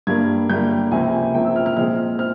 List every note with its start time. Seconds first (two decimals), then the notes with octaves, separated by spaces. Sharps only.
0.07 G2 G3 A#3 G#6
0.49 G2 G3 A#3 G6
0.91 C#2 C3 F3 A#3 G#5
1.34 C#2 C3 F3 A#3 G5
1.45 E6
1.56 F6
1.66 F6
1.77 A#2 F3 G#3 C4 F6
2.19 C4 F6